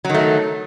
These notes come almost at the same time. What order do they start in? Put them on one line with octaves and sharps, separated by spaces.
F#3 D#3 A3